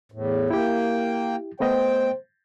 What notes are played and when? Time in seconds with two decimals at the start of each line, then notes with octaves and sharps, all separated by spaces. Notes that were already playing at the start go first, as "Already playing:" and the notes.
0.12 E2 A2
0.51 A#3 E4 G4 G5
1.60 A3 B3 C5 D#5 G5